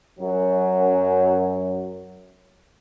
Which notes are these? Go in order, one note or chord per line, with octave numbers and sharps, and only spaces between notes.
F#2 F#3